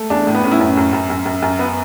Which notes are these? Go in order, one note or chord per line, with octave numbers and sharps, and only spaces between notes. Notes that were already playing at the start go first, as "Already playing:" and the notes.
Already playing: A3
E2 D4
A2
B3
A2 C#4
E4
F#2 C#4
F#2
F#2
F#2
F#2
F#2
B3